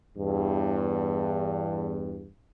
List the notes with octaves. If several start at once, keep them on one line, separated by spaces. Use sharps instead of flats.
E2 G2